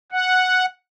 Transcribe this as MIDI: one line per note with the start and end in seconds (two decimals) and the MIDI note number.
0.12 0.66 78